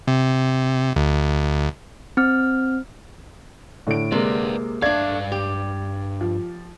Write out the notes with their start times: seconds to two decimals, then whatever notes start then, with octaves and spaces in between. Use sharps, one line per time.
0.08 C3
0.96 D2
2.17 C4 F6
3.87 A2 D3 D7
4.12 C3 G#3 A#3 B4 D5
4.82 G2 A3 D4 D5 F5 G#6
5.32 G4
6.21 F3